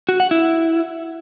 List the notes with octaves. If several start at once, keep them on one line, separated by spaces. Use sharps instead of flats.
F#4
F#5
E4